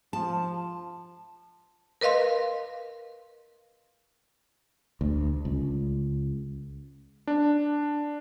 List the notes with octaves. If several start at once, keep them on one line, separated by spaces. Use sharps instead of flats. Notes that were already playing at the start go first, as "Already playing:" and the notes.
F3 A5
A#4 B4 D#5 F5 C6
D2
C#2
D4